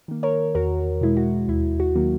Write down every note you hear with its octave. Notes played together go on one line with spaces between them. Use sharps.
D#3 A#3
A#4 C#5
E2 F#4 A#4
B2 G#3 E4
F#4
D#2 E4
F#4
D#3 F#3 A#3